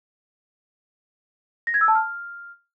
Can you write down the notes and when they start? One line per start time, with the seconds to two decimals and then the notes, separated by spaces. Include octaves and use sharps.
1.67 A#6
1.74 G#6
1.81 E6
1.88 A5
1.95 F6